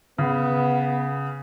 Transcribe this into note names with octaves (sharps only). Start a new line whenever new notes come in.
C#3 B3